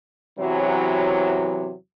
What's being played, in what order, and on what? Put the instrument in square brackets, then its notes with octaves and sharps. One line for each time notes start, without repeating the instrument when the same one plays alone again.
[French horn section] E2 C3 E3 F#3